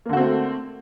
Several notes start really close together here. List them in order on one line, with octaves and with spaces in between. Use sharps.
A#3 D3 F#4 C4 A3